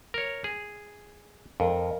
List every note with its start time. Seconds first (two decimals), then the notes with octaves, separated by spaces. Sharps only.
0.14 A#4 C#5
0.44 G#4
1.60 F2 A#4 D#5